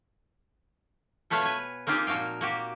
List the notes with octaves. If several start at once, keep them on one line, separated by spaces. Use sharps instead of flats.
B2 A3 B4 C#5 F5 A5
B4 G#5
A#3 C4 D#4 F4 G4 G#4
A#2 F3 F#4 F5 G5
A#3 F#4 G4